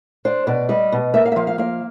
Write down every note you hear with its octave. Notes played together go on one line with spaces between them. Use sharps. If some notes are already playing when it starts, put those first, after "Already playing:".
D4 C5
B2 D5
G3 D#5
B2
A#3 E5
F5
E5
F3 F5
F5
A#3 F5